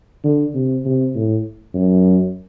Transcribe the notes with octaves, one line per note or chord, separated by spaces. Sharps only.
D3
C3
C3
A2
F#2